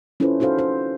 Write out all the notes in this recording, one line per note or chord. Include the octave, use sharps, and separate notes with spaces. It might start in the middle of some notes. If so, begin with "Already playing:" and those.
C#4 E4 F4 A4 B4 C5
D#4 F#4 A4 C5 F5
C5